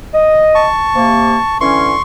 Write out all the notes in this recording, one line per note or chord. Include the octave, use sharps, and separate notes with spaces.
D#5
A5 C#6
C3 A#3
D3 E3 C#4 C6 C#6